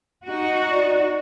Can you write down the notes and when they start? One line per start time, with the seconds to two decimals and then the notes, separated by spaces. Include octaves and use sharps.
0.25 D#4 F#4
0.70 D5